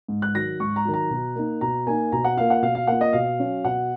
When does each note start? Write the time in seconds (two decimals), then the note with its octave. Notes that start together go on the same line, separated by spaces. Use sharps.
0.08 G#2
0.22 F#6
0.34 D#3 F#3 A#6
0.60 G#2 C#6
0.76 A#5
0.85 D#3 F#3
0.94 A#5
1.10 B2
1.36 A#3 D#4
1.61 B2 A#5
1.87 A#3 D#4 G#5
2.12 B2 A#5
2.25 F#5
2.37 A#3 F4 F5
2.50 F#5
2.62 B2 F5
2.75 F5
2.87 A#3 F4 F#5
3.01 D#5
3.13 B2 F5
3.39 F#3 C#4
3.64 B2 F#5